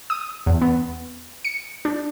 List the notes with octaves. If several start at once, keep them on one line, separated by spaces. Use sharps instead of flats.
D#6
E2
B3
C#7
D4